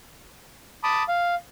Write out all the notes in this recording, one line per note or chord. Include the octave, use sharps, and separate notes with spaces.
A5 B5 D6 D#6
F5